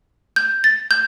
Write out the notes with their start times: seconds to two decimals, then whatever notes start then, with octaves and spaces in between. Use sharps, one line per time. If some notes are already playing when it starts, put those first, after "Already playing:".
0.36 G6
0.64 A6
0.91 G6